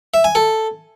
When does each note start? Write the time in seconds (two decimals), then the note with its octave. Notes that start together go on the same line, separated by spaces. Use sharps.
0.14 E5
0.24 G#5
0.35 A4